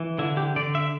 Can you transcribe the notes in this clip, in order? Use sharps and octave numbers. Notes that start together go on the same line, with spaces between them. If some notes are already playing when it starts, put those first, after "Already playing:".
Already playing: E3
D3 E4
G4
D3 D5
E5